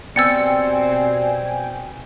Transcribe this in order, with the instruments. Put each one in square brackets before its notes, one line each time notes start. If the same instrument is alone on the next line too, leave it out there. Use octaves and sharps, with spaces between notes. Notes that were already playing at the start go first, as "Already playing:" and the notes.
[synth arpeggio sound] B2 G5 G#5 [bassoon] G3 [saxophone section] C4 [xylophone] E6 A6 C#7